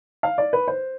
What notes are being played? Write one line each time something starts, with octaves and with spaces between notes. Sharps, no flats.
F5
D5
B4
C5